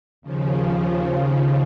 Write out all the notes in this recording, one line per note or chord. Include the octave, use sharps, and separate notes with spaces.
D#2 C#3 F3